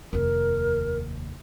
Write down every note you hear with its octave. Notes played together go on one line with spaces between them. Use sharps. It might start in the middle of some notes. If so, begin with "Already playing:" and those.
F1 D#2 A#4